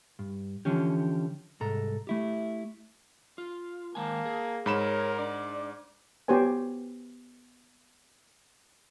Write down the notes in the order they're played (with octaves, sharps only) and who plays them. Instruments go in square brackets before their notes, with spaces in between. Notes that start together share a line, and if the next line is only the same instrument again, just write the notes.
[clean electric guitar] G2
D3 E3 F3 C#4 G4
C2 G#2 A4 A#5
A3 E4 G4
[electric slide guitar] F4
[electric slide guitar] D#3 G#3 G#5 [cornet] A#3 [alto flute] A5
[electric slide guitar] G#4
[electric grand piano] G#2 B5 E7 [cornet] A#4 [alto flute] C#5
[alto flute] D4 [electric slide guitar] D5
[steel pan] B3 F#4 G4 C5 C#5 G#5